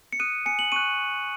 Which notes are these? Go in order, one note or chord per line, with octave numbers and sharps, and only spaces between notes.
C#7
D#6 F#6 D#7
G#5 C#7
F#7
C#6 F#6 D#7